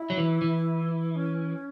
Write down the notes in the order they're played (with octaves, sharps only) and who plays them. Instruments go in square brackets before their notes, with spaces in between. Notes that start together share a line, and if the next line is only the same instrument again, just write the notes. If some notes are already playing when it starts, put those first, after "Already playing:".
Already playing: [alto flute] E4
[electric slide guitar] F#3
E3
E3
[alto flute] C#4